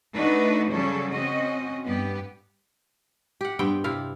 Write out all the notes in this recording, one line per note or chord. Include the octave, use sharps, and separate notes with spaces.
A3 D4 D#4 F#4 B4
C#3 F#3 G3 C#4 A4
C4 C#4 F#4 D#5
G2 B3 G4
G4 F#5
G2 B3 C4 G5
C3 E4 F5